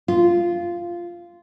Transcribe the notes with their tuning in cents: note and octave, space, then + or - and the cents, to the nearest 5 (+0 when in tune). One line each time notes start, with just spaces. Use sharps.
F4 -10